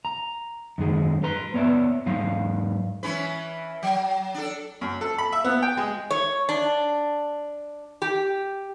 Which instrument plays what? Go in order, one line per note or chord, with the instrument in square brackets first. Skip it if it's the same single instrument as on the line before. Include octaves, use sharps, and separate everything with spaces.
[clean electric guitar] A#5
F#2 D#3 G#3
B4 A#5 C6
B3 C#5 D5 E5
G#2 F#3 F5
[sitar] E3 C#4 B4
F#3
D4 A4
[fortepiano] F#2
A4
B5
E5
B3
G5
G#3
[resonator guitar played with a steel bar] C#5
D4
G4